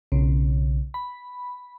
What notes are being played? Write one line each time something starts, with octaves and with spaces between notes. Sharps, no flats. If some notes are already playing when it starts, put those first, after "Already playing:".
B1 C#3
B5